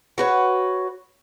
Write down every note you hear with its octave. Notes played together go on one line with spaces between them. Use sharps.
F#4 B4 C#5